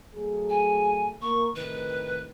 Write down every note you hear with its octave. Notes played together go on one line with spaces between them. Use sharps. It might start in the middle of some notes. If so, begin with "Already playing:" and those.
F#3 A3 G#4
G#5
A#3 C#6
A2 C3 D#3 B4